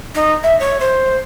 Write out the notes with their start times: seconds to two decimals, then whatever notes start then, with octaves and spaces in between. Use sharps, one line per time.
0.15 D#4
0.43 E5
0.60 C#5
0.81 C5